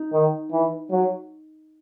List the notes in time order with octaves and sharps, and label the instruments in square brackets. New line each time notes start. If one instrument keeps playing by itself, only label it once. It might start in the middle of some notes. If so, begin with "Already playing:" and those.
Already playing: [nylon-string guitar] D#4
[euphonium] D#3
E3
F#3